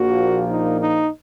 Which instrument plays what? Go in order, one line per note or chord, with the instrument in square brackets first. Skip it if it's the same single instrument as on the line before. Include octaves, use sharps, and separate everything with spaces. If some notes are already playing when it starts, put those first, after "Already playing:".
Already playing: [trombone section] A#1 A#2 F3 A#3 F#4
D#4
D#4